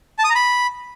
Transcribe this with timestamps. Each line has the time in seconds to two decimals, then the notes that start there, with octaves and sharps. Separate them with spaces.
0.19 A5
0.24 D#6
0.30 A#5
0.35 B5